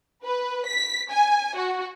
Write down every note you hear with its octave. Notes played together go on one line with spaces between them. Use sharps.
B4
B6
G#5
F#4